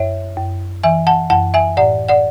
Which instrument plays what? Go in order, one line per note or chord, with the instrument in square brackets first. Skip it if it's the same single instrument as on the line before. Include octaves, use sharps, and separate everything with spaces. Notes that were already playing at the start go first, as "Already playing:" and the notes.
Already playing: [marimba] F#2 C#5 E5
F#2
E3 E5 G#5
F#5 A5
F#2 F#5 A5
E5 G#5
A2 D5 F#5
D5 F#5